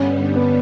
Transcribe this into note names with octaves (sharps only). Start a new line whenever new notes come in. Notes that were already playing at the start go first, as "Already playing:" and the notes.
Already playing: G2 D3 G3 B3 C#4
B3